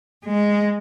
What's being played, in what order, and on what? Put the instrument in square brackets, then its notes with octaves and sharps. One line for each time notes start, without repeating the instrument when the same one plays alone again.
[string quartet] G#3